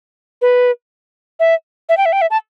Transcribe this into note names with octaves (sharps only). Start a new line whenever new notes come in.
B4
E5
E5
G5
E5
G5
E5
A5